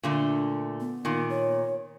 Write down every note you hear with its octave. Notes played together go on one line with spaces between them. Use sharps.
A#2 D3 A3
B3
A#2 D#3
C#5